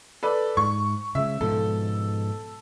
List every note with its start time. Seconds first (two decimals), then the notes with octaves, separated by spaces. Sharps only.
0.23 A4 B4 D5
0.57 G#2 C#6
1.15 C#3 G#3 E5
1.41 G#2 B2 F3 A4